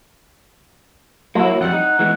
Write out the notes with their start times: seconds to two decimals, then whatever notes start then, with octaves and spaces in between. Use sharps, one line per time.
1.35 F#3 A#3 E4
1.61 F2 G3 F#5
1.73 D#4
1.99 E3 G#3 B3